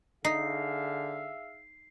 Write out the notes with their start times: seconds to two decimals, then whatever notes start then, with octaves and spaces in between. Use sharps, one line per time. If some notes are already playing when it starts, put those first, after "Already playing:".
0.25 D3 D#4 G#4 E5 F5 C7